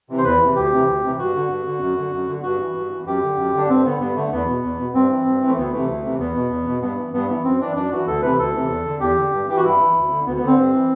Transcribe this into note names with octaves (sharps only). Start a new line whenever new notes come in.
C3 E3
C5
E2 B4
C3 E3
D2 G4
C3 E3
D2
C3 E3
G2 F#4
D3
G2
D3
F#2
D3
F#2
D3
G2 F#4
E3
G2
E3
F#2 G4
D3
F#2
D3 D4
G2 C4
D3 B3
G2 B3
D3 A3
E2 B3
B2
E2
B2
G2 C4
E3
G2
E3
A3
D2 B3
C3 E3 A3
D2
C3 E3
E2 B3
B2
E2
B2
G2 B3
E3
G2 B3
E3 B3
F#2 C4
E3 D4
F#2 D4
E3 F#4
D2 A4
C3 E3 B4
D2 A4
C3 E3
E2
D3
E2 G4
D3
G2
E3 G4
F#4
G2 E4
E3
D2
D3
D2 B3
B3
D3
C4
G2
E3